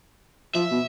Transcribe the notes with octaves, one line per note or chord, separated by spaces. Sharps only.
F3 E5
B2